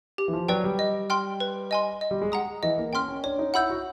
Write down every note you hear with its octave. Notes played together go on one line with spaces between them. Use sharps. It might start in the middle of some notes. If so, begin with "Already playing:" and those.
G4
E3
F3
F#3 B4 D5 G5
G3
D#5
G5 C6 F6
B4
D#5 G#5 C6
D#5
G3
G#3
F#5 A#5 D#6
E3 D#5
A#3
C#4 G5 C6 F6
C#4
D4 C#5
D#4
E4 F#5 B5 E6 G6
F#4